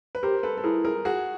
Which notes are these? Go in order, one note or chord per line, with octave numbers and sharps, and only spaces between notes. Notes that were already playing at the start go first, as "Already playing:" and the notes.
B4
G4 A#4 C5
A4 B4
A4
E4 G#4 A#4
G#4 A#4
F#4 G#4